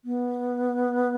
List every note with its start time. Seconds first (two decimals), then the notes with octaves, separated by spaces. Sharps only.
0.05 B3